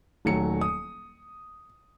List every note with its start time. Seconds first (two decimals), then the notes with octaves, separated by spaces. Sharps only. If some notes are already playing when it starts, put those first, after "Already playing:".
0.25 D#1 D#3 F#3 A3 C#7
0.61 D#6